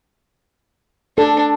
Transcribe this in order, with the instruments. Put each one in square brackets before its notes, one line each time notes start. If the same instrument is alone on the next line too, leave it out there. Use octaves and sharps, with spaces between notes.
[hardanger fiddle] D4 [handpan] A4